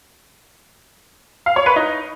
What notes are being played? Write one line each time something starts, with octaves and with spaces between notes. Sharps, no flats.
F5
C#5
B4
D#4